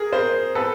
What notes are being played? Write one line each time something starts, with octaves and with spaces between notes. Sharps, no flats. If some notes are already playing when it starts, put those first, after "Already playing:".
Already playing: G#4 A#4
A#4 C5
A4 B4